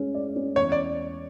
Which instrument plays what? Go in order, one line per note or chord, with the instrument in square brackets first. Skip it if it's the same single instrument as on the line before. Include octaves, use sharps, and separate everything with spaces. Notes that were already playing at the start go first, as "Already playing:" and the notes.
Already playing: [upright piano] G#3 C#4 G#4
D5
C#4
[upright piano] E2 [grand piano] C#5
[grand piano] D5